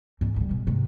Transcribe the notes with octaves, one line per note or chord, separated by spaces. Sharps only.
G#2 E3
D3 G3
B2
G#2 C3